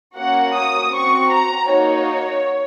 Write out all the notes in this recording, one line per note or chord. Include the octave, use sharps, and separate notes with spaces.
A#3 C#4 F#4 F#5
D#6
C4 F#4 C#6
A#5
A#3 D#4 F#4 C#5